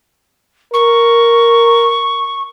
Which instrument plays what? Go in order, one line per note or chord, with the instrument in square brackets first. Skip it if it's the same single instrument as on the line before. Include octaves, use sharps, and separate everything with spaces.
[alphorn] A#4 [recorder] C#6